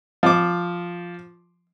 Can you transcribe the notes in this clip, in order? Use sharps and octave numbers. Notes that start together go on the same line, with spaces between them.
F3 D6